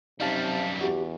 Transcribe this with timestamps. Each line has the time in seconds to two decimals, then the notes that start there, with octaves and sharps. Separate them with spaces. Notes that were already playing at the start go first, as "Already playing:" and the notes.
0.20 F#2 C3 G3 D#4 F5 A5
0.81 E2 F#4 G4